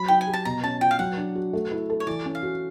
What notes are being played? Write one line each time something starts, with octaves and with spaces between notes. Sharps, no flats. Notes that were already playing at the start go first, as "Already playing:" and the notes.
Already playing: F#3 B5
D#4 G5
G#5
G4
A5
B2 A#5
C#4 A5
F4 G5
F5
F#3 F#5
D4
F#4
A3
E4
A4
C#5
E3 D5
C#4
F5
F#4